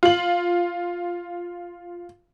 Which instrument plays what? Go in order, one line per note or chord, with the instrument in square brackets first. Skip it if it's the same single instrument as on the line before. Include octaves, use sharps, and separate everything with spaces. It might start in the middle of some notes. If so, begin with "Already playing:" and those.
[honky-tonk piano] F4 F#7